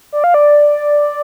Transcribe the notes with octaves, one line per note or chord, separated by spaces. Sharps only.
D5
F5
D5